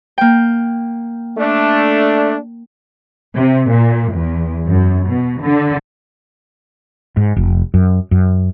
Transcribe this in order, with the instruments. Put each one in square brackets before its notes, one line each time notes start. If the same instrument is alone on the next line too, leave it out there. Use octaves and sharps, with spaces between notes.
[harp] A#3 G5
[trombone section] A3 D4
[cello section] C3
A#2
E2
F#2
B2
D3
[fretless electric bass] G#2
F1
F#2
F#2